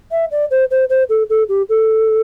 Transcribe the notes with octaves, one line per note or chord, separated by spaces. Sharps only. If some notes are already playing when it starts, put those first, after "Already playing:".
E5
D5
C5
C5
C5
A4
A4
G4
A4